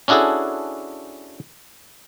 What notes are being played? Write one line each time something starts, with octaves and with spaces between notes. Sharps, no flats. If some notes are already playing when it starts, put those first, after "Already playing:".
C#4 D4 E4 F#4 G#4 A4